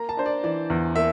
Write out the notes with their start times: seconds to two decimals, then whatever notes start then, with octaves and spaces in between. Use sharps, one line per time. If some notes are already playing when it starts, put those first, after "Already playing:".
Already playing: A#3 A#5
0.09 A5
0.17 D4 C5
0.26 D5
0.43 E3 D5
0.70 E2
0.96 A#3 E5